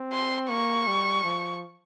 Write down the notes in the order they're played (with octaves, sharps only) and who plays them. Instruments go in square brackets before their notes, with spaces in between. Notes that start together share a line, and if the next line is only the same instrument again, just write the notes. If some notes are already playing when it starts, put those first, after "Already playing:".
Already playing: [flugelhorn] C4
[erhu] C6
[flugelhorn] A#3 [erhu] C#6
[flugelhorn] G3
F3